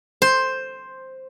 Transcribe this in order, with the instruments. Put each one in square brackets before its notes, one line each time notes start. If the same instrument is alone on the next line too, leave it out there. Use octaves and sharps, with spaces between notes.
[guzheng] C5